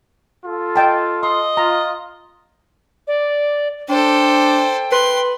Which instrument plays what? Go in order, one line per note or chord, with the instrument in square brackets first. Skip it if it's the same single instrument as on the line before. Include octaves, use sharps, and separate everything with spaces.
[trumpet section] F4 A4
[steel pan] D#5 G5 A5
[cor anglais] D#5 [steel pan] C6
[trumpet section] F4 [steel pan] A#5
[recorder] D5
[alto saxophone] D4 [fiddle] A4 C5 [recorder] G5
[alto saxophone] B4 [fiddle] C6